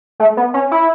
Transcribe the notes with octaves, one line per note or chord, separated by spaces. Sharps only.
A3
B3
C#4
E4